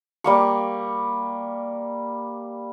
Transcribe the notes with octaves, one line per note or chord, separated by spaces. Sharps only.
G3 A#3 C#6